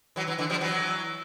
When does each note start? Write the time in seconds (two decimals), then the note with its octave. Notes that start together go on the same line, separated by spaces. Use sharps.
0.16 E3 F#3
0.27 E3 F#3
0.38 D3 E3
0.50 F3 G3
0.61 E3 F#3